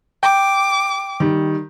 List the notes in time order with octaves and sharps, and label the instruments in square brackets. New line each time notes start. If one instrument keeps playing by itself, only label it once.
[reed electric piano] G5 [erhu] D6
[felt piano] D#3 G3